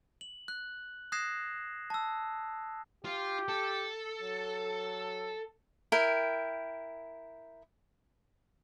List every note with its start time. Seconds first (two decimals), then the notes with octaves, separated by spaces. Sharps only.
0.21 F#7
0.48 F#6
1.12 D#6 F#6 G#6 A#6 C7 E7
1.90 A5 E6
3.05 F4 G4
3.48 A4
4.21 F#3
5.92 E4 A#4 G5